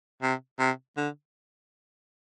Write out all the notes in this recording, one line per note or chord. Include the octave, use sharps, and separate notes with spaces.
C3
C3
D3